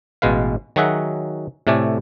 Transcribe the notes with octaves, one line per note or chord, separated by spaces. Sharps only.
A1 B2 G#3 B4 F5
D#3 F#3 F#4 G#4 E5 F#5
A2 C3 A3 D5 G#5